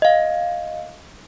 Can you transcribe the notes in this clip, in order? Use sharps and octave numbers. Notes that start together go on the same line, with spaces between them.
D#5 F5